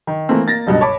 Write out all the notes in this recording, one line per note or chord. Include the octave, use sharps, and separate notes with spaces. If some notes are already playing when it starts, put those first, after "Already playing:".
D#3
E3 A3 A#3 C4
A#3 A6 A#6
F#1 C#2 G2 B2
C#5 A5 B5 D6